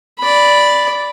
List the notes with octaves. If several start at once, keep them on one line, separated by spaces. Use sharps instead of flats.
D5 B5